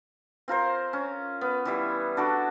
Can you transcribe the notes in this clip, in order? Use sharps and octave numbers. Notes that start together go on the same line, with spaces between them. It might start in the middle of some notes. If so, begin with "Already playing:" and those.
C4 F4 A#4 C5
C#4
B3
E3 G3 E4
D4 F#4 A4